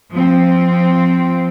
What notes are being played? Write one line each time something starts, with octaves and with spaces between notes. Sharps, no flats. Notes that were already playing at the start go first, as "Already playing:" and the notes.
F3 C4